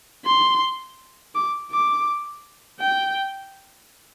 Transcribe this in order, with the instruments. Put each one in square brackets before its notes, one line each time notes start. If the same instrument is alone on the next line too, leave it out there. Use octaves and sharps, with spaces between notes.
[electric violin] C6
D6
D6
G5